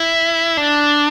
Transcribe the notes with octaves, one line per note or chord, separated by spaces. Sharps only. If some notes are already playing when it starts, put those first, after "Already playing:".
Already playing: E4
D4